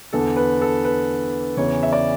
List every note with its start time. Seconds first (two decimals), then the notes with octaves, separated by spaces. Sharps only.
0.13 E2 D3 A4
0.36 B4
0.61 A4
0.84 B4
1.57 E2 C#3 E3 C#5
1.83 E5
1.93 D5